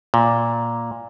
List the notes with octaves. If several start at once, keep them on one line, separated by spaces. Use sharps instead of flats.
A#2